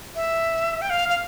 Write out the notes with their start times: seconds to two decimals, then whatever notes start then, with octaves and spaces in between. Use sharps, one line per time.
0.15 E5
0.82 G5
0.90 F5
1.09 F5